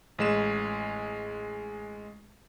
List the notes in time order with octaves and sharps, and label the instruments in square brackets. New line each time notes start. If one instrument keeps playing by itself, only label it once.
[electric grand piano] A1 G#3 E7